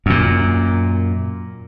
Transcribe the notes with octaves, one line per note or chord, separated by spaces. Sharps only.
F#2 A#2